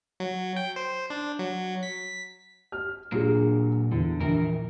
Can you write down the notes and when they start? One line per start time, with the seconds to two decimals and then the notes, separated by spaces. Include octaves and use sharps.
0.20 F#3
0.56 G5
0.76 C5
1.10 D4
1.39 F#3
1.83 B6
2.72 F6
3.12 A#2 F#3 A#3 D4 F4 G#4
3.92 E2 D3
4.20 A#1 E3 A#4